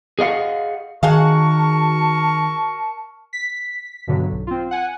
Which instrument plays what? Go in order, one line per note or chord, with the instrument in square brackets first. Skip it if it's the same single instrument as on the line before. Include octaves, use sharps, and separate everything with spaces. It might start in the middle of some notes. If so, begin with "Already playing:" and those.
[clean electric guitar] G#4 D#5 F5 F#5
[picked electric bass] D#3 [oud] F#4 G#4 F5 [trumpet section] A#4 C#6 [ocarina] A5
[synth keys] B6
G2 B2 D3 F#3
B1
C4 F4
F#5 G#5